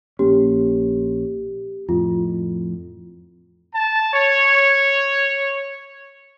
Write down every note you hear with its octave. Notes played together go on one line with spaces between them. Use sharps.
A#1 A#3 C#4 G4
F2 A2 F4
A5
C#5